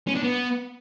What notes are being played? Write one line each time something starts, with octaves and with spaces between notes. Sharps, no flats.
C#4
D4
B3